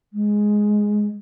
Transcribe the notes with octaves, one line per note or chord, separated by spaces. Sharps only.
G#3